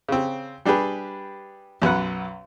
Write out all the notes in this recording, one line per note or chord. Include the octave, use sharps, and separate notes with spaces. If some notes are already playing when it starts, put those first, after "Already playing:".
C#3 C4
G3 D4 G4 G#4 B4
B1 F#2 B4 F#5